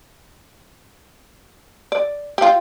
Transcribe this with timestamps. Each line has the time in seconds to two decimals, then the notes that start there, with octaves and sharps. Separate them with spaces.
1.92 D5
2.38 F4 G4